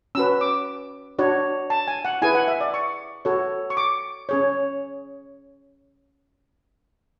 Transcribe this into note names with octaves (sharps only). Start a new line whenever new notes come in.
C#4 F#4 B4 E6
D6
D4 F#4 C#5
A5
G#5
F#5
E4 G#4 B4 G#5
F#5
E5
D5
C#6
F#4 A4 C#5
C#6
D6
C#4 G#4 C#5